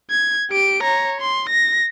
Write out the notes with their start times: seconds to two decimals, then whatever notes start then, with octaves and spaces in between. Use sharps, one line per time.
0.11 G#6
0.51 G4 D7
0.83 C#5 A#5
1.21 C6
1.50 A#6